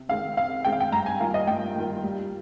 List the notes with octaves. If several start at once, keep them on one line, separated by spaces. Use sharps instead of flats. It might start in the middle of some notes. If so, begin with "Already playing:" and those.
Already playing: C3
D#3 G#3 C4 F5
C3 F5
D#3 G#3 C4 G5
F5
G5
G2 A#5
G#5
D#3 A#3 F4 A#4 F5
D#5
G2 G5
D#3 A#3 F4 A#4
G3